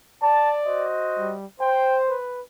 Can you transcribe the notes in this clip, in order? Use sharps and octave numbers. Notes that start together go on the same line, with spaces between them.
D5 A5
F#4 C5 D#5
G3
C5 G5
B4